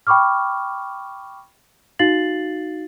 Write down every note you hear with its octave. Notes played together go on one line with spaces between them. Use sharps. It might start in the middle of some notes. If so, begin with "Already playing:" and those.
G5 B5 C#6 D6 F6
D#4 F#4 F5 A6 C7 F#7